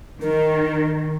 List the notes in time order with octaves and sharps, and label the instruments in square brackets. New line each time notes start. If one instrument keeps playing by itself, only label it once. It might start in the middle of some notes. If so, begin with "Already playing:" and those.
[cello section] D#3 [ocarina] A#4